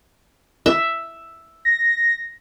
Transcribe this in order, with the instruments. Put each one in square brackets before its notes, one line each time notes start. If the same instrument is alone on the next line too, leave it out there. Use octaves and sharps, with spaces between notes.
[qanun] E5
[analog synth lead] A#6